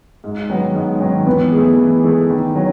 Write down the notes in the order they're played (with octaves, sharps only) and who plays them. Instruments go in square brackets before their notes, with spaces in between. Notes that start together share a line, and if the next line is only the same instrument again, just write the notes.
[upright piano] G#2
D#3 F#3 B3
G#2
D#3 F#3 B3
[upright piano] E3 [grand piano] B3
[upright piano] A3 E4 G#4
E3
A3 E4 G#4
D#3
F#3 C#4